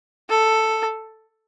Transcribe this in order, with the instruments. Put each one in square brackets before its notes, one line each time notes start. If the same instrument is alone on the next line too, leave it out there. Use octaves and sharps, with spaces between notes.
[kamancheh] A4